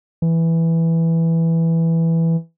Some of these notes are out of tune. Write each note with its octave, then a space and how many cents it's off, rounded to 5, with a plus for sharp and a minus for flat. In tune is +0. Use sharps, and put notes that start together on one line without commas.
E3 +0